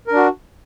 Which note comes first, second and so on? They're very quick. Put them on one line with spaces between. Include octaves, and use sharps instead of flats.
A#4 D4 F#4